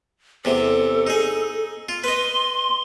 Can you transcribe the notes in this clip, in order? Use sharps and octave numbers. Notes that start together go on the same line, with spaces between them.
E2 C3 A4
D#4 G#4
F4
B4 D#5 C6